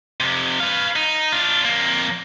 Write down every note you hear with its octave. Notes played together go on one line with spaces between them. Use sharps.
F2 C3
B4 F5
D#4
D4 F4
F2 A#3